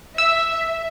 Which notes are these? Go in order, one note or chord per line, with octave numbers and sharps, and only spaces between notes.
E5 E6